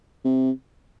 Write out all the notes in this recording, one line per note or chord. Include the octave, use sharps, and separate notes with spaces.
C3